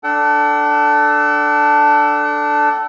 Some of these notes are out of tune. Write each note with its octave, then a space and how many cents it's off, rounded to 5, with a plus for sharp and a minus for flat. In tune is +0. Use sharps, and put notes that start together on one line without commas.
D4 +0 A4 +0 F#5 +45